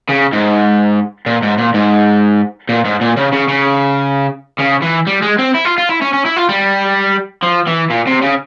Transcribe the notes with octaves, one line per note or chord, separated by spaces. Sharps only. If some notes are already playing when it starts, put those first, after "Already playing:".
C#3
G#2
A#2
G#2
A#2
G#2
A#2
G#2
A#2
C#3
C#3
C#3
C#3
E3
G3
G#3
C4
E4
F4
F4
E4
C#4
C#4
E4
F4
G3
F3
E3
A#2
C3
C#3